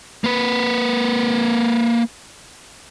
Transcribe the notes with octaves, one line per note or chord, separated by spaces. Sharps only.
A#3 B4